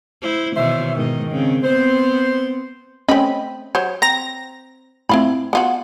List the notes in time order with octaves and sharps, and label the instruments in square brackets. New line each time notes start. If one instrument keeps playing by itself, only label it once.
[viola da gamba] E4 C5
[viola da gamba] B2 D#3 E3 [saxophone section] C5 C#5 E5
[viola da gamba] G#2 B2 D#5 [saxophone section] D#3
[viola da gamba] C#3 C4
[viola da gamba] B3 C4 [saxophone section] C5
[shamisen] A3 C4 [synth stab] C#4 D#5 B5
[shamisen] F#3 C5 C#5
[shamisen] C4 [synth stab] A#5 A#6
[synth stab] A2 C4 [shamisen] E4 F4 B5
[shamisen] B3 F4 F#4